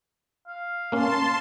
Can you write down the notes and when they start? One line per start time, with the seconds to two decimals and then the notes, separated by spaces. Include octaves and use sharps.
0.47 F5
0.92 A#3 C#4 A5 C6